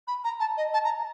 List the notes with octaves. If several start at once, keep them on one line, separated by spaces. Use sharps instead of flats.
B5
A#5
A5
D#5
A5
A#5